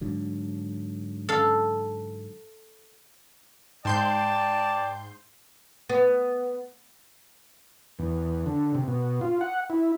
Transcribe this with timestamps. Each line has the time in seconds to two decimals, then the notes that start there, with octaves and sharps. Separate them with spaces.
0.01 G#2 D3 F#3
1.29 A4 F5
3.85 G#2 D5 G5 A5 C6 G6
5.90 B3
7.99 E2
8.46 D3
8.75 C3
8.88 B2
9.21 F4
9.41 F#5
9.70 E4